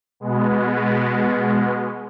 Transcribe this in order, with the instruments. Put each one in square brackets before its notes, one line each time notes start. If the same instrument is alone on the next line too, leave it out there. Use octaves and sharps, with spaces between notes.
[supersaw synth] B2 G#3 B3